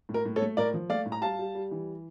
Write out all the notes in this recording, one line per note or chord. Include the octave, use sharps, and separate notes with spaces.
A2
A#4
A2
A4 C#5
A3
A2 A#4 D5
F3
A3 D5 F5
A2
A#5
G3 F5 A5
G3
G3
E3